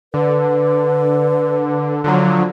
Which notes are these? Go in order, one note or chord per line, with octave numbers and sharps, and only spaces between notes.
D3 B4
D3 F3 F#3